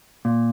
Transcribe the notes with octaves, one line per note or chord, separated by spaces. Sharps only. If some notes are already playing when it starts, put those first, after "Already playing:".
A#2